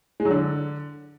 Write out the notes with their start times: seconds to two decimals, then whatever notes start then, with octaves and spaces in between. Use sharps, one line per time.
0.20 G#3
0.25 F#3
0.31 D3